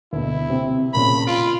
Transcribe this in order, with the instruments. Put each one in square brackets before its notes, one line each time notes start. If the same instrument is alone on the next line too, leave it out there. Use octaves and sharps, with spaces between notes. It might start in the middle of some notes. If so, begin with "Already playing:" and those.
[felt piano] D2 B2 [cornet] E4
[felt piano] C3 C4
[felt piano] A#2 C#3 [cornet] B5
[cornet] F4 [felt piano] D7